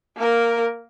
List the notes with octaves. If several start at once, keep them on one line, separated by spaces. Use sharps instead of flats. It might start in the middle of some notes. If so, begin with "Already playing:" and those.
A#3 A#4